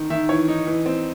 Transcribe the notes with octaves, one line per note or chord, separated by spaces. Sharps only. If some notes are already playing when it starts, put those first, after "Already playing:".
Already playing: D#3
D#3 E5
E3 C#5
D#4
E3
C4